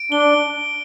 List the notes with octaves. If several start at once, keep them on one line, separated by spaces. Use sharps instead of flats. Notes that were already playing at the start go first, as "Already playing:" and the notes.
Already playing: D7
D4 G7